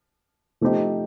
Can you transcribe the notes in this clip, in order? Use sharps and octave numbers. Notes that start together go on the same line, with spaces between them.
F3 A3 C4 D#4 G4